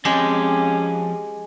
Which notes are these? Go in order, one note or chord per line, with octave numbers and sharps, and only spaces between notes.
F2 G#3 C#4 G4